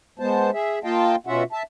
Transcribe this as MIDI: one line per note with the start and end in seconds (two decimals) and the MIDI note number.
0.19 0.50 56
0.19 0.50 59
0.19 0.50 72
0.19 0.50 81
0.53 0.79 68
0.53 0.79 76
0.84 1.16 58
0.84 1.16 65
0.84 1.16 75
0.84 1.16 77
0.84 1.16 79
0.84 1.16 81
1.27 1.43 47
1.27 1.43 61
1.27 1.43 65
1.27 1.43 66
1.27 1.43 76
1.27 1.43 78
1.52 1.63 76
1.52 1.63 81